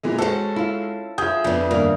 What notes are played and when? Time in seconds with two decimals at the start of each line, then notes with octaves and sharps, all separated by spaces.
0.03 A#2 E3 G#3
0.18 G#3 C#4 F#4 A4 C5
0.56 E4 F4
1.18 F3 G#4 E5 G6
1.44 F2 F3 B3 D4
1.71 G2 D#3 A#3